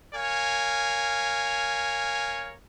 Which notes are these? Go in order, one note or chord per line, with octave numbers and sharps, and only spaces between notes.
A#4 C#5 F5 G#5